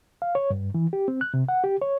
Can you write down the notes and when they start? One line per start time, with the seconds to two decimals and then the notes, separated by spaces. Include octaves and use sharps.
0.22 F5
0.35 C#5
0.50 G2
0.74 E3
0.93 G4
1.08 C4
1.21 F#6
1.34 C3
1.49 F#5
1.64 G4
1.82 C#5